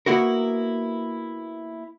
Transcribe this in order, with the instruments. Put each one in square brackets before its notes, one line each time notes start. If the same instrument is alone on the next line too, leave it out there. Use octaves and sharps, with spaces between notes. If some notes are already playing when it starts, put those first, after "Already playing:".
[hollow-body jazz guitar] A#3 B3 E4 F#4 A#4